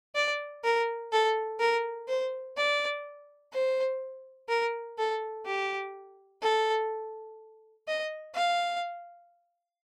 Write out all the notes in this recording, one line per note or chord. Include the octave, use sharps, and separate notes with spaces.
D5
A#4
A4
A#4
C5
D5
C5
A#4
A4
G4
A4
D#5
F5